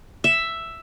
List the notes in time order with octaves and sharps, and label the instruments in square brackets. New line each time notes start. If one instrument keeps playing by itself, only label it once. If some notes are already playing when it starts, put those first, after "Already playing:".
[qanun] E5